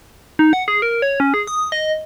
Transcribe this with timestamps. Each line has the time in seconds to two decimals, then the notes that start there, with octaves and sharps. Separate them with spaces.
0.39 D#4
0.53 F#5
0.68 G#4
0.82 A#4
1.02 C#5
1.20 C#4
1.34 G#4
1.47 D#6
1.72 D#5